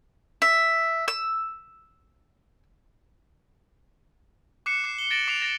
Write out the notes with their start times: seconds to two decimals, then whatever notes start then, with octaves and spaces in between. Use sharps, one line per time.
0.42 E5
1.08 E6
4.66 D6 F#6 C7 C#7 E7
4.84 D6 C7
4.99 G7
5.11 A6 A#6 D7 E7 F#7
5.28 D6 C7 D7 F7
5.42 A6 A#6 D7